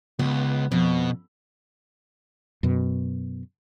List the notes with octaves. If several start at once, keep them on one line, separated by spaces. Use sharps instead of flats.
C#2 B3
F2 B2
F#2 B2